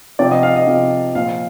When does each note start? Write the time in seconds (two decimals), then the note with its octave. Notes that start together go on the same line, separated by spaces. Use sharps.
0.19 C3 F3 D5
0.31 D#5
0.43 F5
0.56 D#5
0.67 C3 F3
1.15 A#2 F3 F5